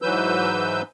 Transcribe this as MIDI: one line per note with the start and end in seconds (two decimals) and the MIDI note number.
0.02 0.82 44
0.02 0.82 52
0.02 0.82 54
0.02 0.82 71
0.02 0.82 88
0.02 0.82 91